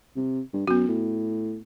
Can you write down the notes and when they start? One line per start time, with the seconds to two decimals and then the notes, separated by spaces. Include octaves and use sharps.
0.16 C3
0.53 G2
0.68 F#2 B3 F#4
0.88 A2